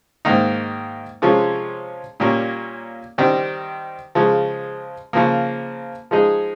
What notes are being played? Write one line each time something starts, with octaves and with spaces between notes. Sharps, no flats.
G#2 D#3 A#3 D#4
C3 F3 G#3 C#4 F4
A#2 G3 A#3 C#4
D#3 G3 C4
C#3 F3 G#3
C#3 F3 A#3
F3 G#3 D#4 G#4